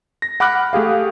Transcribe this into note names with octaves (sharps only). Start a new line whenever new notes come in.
A#6
F#5 B5 D6 F6 F#6
A3 G4 G#4 F5